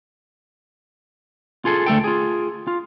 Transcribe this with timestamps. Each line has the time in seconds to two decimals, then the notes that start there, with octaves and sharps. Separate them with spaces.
1.65 F4 G#4 A4
1.86 D2 A3 A4 G5
2.04 F4 G#4
2.67 F4